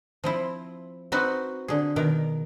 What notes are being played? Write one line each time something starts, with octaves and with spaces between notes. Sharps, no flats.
F3 C4 E4
C4 D#4 F#4 B4
D3 G#4
B2 D#3 A#4